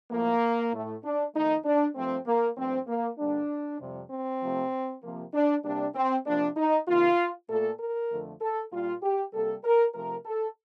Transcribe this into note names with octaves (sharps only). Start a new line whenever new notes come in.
A2 F3 A3 A#3
A2 A3
D4
F2 D#3 A3 D#4
D4
G2 F3 A3 C4
A#3
G2 F3 A3 C4
A#3
G2 D3 G3 A#3 D4
F2 C3 G3
C4
C3 F3 A3
C3 F3 A#3
D4
C3 G3 A#3 D4
C4
C3 F3 A#3 D4
D#4
C3 D#3 A#3 F4
A#2 A3 A4
A#4
F2 D3 F3 A3
A4
A#2 G3 A#3 F4
G4
C3 G3 A#3 A4
A#4
C3 F3 A3 A#4
A4